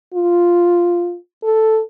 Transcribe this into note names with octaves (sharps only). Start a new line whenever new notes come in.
F4
A4